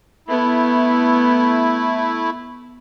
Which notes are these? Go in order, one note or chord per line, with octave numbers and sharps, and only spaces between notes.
A3 B3 E4